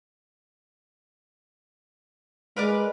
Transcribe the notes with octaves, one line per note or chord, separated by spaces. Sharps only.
G#3 A#4 B4 D5